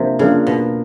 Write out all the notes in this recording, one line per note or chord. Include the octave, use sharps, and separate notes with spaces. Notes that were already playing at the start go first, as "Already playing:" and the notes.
Already playing: C3 F3 A#3 D4
C#3 F3 A#3 D4
B2